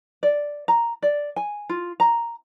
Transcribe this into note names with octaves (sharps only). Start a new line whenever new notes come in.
D5
A#5
D5
G#5
F4
A#5